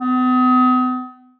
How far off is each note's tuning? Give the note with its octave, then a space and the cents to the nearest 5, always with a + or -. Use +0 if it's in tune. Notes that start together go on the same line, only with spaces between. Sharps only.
B3 +45